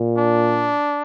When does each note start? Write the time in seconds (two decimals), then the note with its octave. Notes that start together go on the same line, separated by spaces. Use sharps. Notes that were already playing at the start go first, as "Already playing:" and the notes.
Already playing: A#2
0.18 D4